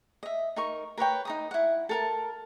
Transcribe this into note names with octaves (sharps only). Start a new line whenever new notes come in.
D#5 E5
D#4 A#4 C#6
A#4 B4 C#5 G5
D#4 A#5 D#6
E4 F#5
A4 A#4 A5